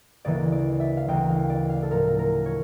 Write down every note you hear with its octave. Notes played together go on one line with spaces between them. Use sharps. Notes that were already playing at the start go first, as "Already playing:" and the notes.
D2 C#3 E3 A#3 D5
D5
E5
F5
D2 C#3 E3 A#3 G5
F5
D5
F5
A4
A2 F3 A3 A#4
A#4
C#5